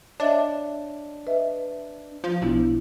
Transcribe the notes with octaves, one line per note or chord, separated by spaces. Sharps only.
D4 C#5 D#5 E5
B4 D#5 E5
F3
B1 B3 D4 E4